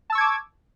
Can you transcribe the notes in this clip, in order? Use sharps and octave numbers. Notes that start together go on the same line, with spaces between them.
A5 C#6 D6 E6 G#6